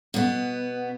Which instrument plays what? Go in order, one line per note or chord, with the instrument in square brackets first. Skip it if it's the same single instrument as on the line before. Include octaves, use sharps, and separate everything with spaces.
[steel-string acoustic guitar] B2 B3